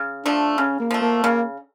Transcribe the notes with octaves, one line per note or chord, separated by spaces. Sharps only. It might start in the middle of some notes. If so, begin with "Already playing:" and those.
Already playing: C#3
F3 A3 D4
C#3 C#4
A#3
F3 A3
A#3
C#3 A#3